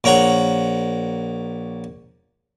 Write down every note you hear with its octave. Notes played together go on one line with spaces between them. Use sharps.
A#1 A#4 C#5 F#5 A#5